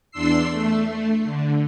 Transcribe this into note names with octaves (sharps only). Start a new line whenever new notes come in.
E2 D4 C6 E6 C7
A3
D3